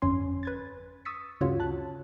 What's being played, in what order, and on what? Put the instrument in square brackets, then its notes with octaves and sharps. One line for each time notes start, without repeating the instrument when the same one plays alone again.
[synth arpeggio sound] G1 F2 C#4 G#5 C6
B4 G#6 A6
C#6 D#6 E6 A6 B6 C#7
D2 G2 C#3 F4 F#4 C#5
A5 F#6